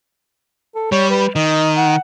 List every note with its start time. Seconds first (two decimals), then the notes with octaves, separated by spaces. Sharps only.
0.75 A4
0.92 G3 C#5
1.10 B4
1.36 D#3 D#5
1.77 F#5